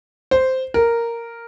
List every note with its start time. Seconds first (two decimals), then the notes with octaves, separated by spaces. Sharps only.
0.31 C5
0.74 A#4